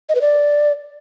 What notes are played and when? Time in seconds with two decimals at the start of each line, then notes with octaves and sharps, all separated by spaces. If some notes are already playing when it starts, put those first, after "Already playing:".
0.09 D#5
0.15 B4
0.21 D5